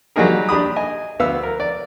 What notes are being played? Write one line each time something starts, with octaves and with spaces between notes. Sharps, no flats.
F#3 G3 A#3 D#4 G#4 A#4
D4 G4 B5 D#6
D#5 G#5
D2 B3 F5 E6
A#4
D5